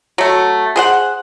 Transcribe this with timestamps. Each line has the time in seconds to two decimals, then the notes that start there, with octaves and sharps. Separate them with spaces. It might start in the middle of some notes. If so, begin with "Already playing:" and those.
0.18 F#3 A3
0.76 G#4 C5 F#5